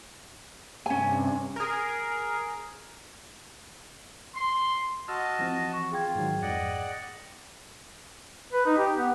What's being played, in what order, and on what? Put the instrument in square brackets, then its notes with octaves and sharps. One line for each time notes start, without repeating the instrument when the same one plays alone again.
[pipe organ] G2 C3 [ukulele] C#4 G#5
[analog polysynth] G#4 A#4
[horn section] C6
[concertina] F#4 D#5 A5 [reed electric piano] E6 F6
[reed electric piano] E3 F3 C4 [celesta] A#6
[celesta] C#6
[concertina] F4 [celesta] G#4 G5 G#6
[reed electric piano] G#2 D#3 F#3
[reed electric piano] F2 G#2 [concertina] D5 D#5 F#5
[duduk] B4
D#4
G4
B3